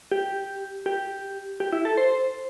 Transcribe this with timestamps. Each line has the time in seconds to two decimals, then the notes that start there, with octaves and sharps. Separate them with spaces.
0.11 G4
0.86 G4
1.60 G4
1.72 E4
1.85 A4
1.97 C5